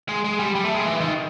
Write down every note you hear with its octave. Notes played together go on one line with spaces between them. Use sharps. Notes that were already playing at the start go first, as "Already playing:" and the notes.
G#3
G#3
G3
G3
A3
G#3
E3
D#3